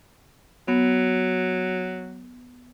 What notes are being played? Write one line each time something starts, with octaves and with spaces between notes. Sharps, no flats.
F#3 B3